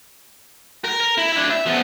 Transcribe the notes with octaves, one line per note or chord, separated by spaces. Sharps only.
A#4
A#4
E4
D4 E4
E5
F3 B3